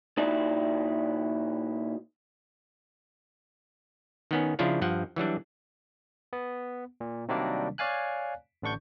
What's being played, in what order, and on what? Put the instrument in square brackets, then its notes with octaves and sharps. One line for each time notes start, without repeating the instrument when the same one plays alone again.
[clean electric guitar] A#2 D#4 E4 F#4 D5
[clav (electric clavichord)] D#3 B3 C#4
C#3 F3 D4 E4 F4 C#5
G2 F3 F#5
E3 F#3 G3 D4
[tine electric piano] B3
A#2
C3 D#3 F#3 G3 A#3 D4
C#5 D5 F5 G#5 F#6
A1 D3 D4 C#6 G6